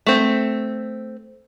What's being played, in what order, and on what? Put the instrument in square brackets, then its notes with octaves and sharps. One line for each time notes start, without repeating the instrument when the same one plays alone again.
[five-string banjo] A3 C4